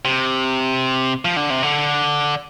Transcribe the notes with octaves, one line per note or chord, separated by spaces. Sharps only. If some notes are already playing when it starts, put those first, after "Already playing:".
C3
F3
D3
C3
D3